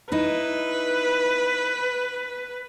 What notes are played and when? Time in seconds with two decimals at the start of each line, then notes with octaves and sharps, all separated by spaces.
0.12 D#4 E4 B4